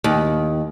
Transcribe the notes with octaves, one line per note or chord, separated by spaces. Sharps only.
D#2